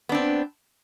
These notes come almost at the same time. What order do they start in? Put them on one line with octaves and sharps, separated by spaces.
B3 D4 C4